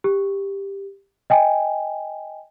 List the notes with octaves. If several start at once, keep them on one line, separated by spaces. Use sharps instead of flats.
G4
D#5 G5 G#5